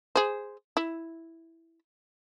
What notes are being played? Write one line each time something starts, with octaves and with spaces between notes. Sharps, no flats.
G#4 C5
E4